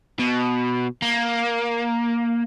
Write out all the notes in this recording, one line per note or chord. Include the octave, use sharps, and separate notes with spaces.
B2
A#3